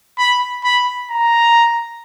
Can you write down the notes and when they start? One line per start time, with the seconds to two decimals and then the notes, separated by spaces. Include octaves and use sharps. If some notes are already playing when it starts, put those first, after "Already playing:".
0.18 B5
0.64 B5
1.11 A#5